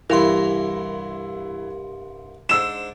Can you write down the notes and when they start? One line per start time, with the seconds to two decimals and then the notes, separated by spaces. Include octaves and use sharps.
0.10 C2 G2 E3 E4 A#4 F5 C6
2.49 G#2 D4 C5 E6 E7